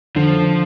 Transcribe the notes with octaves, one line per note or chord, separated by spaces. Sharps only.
D3 F3